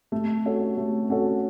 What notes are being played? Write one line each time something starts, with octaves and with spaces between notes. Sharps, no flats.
A3
C#4 F#4 A4 C#5
A3
C#4 F#4 A4 C#5